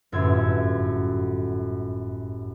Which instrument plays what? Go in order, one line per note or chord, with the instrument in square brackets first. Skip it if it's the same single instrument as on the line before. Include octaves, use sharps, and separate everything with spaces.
[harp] G1 F#2 A2 F4 E6 G#6